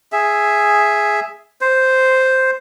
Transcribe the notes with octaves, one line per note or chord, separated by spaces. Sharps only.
G#4 E5
C5